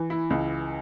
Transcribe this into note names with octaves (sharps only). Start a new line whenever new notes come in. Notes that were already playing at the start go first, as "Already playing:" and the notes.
Already playing: E3
E4
C#2